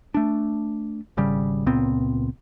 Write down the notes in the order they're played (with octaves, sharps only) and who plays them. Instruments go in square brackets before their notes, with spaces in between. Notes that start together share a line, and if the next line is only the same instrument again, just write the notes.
[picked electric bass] A3 D4
G#1 C#3 G3
C#2 A#2 B3 C4